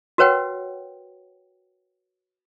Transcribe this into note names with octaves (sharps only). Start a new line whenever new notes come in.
F#4 A#4 B4 C#5 F#5 G5